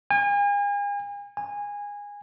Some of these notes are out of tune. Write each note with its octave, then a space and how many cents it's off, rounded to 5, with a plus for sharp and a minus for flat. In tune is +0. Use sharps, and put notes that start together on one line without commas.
G#5 -40
G#5 -20